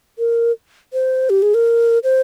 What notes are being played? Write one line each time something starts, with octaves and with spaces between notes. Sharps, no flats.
A#4
C5
G4
G#4
A#4
C5